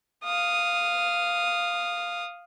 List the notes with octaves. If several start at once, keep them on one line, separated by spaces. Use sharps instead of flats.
F5 D#6